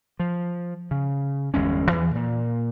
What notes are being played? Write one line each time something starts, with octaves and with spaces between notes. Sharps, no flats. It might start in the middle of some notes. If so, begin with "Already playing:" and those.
F3
C#3
G1 E2 G#3 C#4
E2 E3 F3
A#2